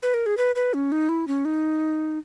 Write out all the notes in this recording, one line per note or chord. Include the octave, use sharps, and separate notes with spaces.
B4
A#4
G#4
B4
B4
C#4
D#4
E4
C#4
D#4